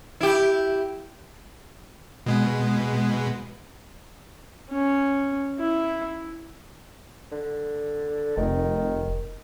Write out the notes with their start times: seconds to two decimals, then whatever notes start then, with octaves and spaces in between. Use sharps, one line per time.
0.21 E4 G4
2.26 B2 G#3 B3
4.70 C#4
5.59 E4
7.32 D3
8.37 F1 D#3